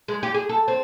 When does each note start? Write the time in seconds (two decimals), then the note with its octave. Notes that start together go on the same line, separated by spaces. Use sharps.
0.08 G#3
0.23 G4
0.34 G#4
0.49 A4
0.68 C4